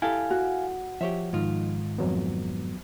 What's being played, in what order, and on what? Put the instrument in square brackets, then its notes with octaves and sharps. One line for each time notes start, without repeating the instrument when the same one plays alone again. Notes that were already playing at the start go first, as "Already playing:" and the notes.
[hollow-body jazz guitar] E4 G4 A4 [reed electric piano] F5 G#5
[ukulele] F#4
[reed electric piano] F3 [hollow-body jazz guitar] G4 C#5 E5
[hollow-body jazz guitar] G#2 D#3 F4
[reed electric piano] F2 F#3 B3